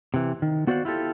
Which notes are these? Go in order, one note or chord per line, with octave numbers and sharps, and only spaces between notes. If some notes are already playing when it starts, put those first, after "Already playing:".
C3 E3
D#3
B3 F#4 C5 D5 F5 F#5
E4 F4 G4 A4